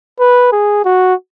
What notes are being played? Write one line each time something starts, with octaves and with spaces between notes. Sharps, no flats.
B4
G#4
F#4